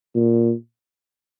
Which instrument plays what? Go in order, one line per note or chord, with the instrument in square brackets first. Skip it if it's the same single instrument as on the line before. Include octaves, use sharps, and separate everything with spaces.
[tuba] A#2